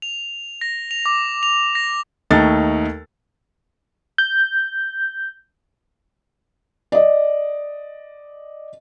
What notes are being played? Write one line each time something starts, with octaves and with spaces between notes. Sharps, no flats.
F7
A#6
F7
D6
F7
A#6
D#2 A3 D#4 A4 A6
G6
D5 D#5